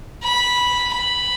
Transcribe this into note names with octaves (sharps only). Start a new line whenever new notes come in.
B5
B5